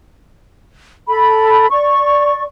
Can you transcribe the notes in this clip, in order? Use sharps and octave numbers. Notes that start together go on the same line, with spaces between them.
A4 B5
D5 C#6